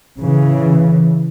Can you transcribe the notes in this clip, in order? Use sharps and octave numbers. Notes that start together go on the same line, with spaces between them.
C#3 E3